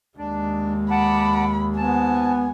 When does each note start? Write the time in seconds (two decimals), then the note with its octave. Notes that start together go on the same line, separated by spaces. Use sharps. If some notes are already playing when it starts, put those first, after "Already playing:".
0.18 D#2 G#3 D4
0.91 F#5 A5 B5 D6
1.77 G#2 B3 G#5 A5